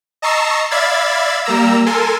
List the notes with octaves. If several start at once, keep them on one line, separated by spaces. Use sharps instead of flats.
D#5 A5 A#5 C#6 E6 C7
D5 E5 F5 B5 G#6 A6
G3 A#3 A#5 E6
A4 A#4 G#5 C6